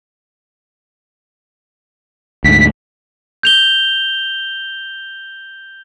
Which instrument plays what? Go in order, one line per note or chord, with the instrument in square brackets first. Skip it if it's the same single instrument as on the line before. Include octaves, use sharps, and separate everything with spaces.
[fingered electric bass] D2 G#2 [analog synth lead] B6
[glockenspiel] G6 F7 G7